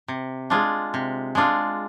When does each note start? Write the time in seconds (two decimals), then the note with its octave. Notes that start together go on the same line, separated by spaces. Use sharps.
0.08 C3
0.50 G#3 D4 F4
0.94 C3
1.35 G#3 D4 F4